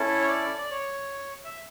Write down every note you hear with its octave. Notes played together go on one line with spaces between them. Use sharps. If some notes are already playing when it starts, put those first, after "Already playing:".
Already playing: C#4 E4 A4
C#5
D5
D5
C#5
E5